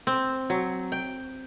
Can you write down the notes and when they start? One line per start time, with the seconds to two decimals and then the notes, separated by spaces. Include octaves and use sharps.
0.07 C4
0.50 F#3
0.92 G5